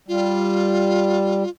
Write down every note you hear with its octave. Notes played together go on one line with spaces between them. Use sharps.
G3 F4